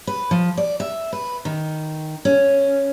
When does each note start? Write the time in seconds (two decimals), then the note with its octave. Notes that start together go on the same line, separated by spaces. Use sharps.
0.07 B4
0.31 F3
0.57 D5
0.80 E5
1.13 B4
1.45 D#3
2.25 C#4